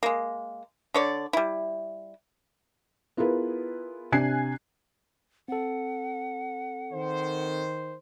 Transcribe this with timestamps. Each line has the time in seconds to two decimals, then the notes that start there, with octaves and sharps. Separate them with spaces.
0.03 G#3 A#3
0.94 D3 C#5 D5
1.33 G3 E4
3.17 B3 E4 F4 G#4 A#4 B4
4.12 C3 D4 G#5 F#6 G#6 C7
5.48 C4 A4 F#5
6.92 D#3 C5